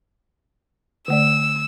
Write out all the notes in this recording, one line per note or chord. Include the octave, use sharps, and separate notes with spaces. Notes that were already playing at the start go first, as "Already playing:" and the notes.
D3 A3 D5 E6